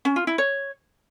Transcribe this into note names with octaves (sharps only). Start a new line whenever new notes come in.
C#4
F4
E4
C#5